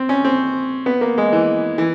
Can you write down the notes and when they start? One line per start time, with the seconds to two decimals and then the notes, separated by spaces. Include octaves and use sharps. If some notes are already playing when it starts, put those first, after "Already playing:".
Already playing: C4
0.09 C#4
0.25 C4
0.86 B3
1.01 A#3
1.18 G#3
1.33 E3
1.78 E3